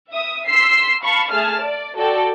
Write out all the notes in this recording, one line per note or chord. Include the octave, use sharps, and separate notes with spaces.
E5 D#6
C6 E6 B6 C7
F5 A5 B5 C#6
A3 G#4 A5 F6
D5
F#4 A4 D5 G5